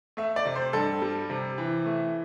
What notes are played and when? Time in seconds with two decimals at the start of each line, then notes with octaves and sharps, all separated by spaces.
0.17 A3 E5
0.36 D5
0.46 C3
0.55 C5
0.73 G2 A4
1.02 G3
1.30 C3
1.58 E3
1.86 A3